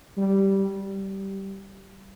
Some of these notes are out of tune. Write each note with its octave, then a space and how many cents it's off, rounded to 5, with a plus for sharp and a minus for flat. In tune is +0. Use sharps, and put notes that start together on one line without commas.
G3 -10
G3 -15